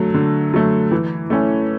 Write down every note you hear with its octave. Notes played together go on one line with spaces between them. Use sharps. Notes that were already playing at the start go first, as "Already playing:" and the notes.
Already playing: D3 F#3 A3
D3
F#3 A3
E3
A3 C#4